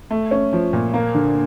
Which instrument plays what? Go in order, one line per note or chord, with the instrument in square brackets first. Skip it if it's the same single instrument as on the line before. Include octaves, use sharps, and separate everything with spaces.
[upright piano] A3
C#4
F3
A#2
A#3
D3